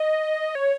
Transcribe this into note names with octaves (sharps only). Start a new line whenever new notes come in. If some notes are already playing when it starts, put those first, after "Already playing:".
Already playing: D#5
C#5